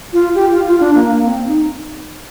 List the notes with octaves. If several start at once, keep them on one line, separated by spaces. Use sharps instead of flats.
F4
G4
F4
F4
D4
A#3
A#3
C4
D#4